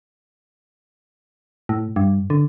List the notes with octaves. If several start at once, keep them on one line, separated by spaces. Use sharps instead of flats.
A2
G2
D3